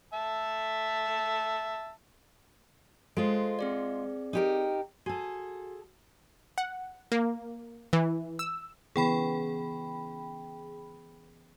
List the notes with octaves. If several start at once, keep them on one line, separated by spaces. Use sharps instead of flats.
E5 A5
G#3 F4 A4 C5
C4 G#4 D5
D#4 G4 A#4
F#4 G#4 A4
F#5
A#3
E3
E6
C#3 E3 B3 G#4 G5 B5